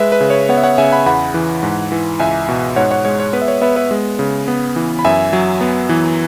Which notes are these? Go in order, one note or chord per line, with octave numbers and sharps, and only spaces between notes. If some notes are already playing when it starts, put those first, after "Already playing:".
Already playing: G#3 B4 E5
B4
C#3
C#5
B3 C#5 F#5
E5
C#5 F#5
C#3 E5 G#5
F#5 B5
E2 F#5 B5
E3
G#2
E3
C#2 E5 G#5
B2
G#2 C#5 F#5
C#5 F#5
G#3 C#5
C#5
B3 B4
E5
C#5
B3 B4 E5
B4 E5
G#3
C#3
B3
E3
B5
F#2 E5 G#5
F#3
B3
E3